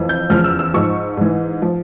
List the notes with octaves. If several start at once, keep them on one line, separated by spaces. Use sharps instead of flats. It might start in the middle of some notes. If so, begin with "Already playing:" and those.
Already playing: F2 E3
G6
E2 C#3 F3 F6
E6
E6
G#2 F3 C#6
G#2 E3
F3